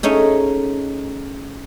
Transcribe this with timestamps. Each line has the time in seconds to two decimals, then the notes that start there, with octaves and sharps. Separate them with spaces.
0.03 A3 C#4 D#4 G#4